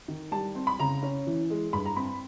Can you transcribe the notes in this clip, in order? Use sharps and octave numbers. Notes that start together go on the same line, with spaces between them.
D#3
G3 A5
C4
B5
C#3 A#5
C#4
E3
G#3
G2 B5
A#5
C4 B5